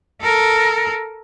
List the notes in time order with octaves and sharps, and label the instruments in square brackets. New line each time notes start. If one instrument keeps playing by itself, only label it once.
[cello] A4 A#4